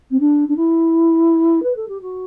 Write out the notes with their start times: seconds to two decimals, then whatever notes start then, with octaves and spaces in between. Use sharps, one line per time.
0.11 C4
0.20 D4
0.48 D4
0.56 E4
1.63 B4
1.76 A4
1.88 G4
2.01 F#4